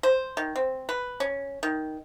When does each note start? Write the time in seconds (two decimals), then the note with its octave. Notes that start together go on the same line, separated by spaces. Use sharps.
0.03 C5
0.37 D#3
0.56 C4
0.89 B4
1.20 C#4
1.63 D#3